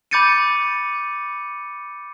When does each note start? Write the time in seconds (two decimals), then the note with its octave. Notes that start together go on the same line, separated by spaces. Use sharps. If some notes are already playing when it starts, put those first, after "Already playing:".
0.11 B5 D6 G6 A6 C#7 D#7